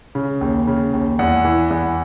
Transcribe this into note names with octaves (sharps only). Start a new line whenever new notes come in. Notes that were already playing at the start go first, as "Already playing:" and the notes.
C#3
D#2
C#3
D#2
E2 F#5
E3
E2